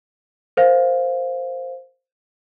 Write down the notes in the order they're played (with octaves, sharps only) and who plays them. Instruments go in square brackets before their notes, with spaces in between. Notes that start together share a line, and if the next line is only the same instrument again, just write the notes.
[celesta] A#4 C5 F5